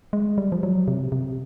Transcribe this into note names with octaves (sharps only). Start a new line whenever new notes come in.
G#3
G3
F3
F#3
C3
C3